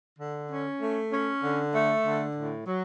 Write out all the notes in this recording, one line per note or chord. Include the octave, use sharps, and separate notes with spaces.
D3
C#4
A3
C#4
D3
A3
D3
A2
F#3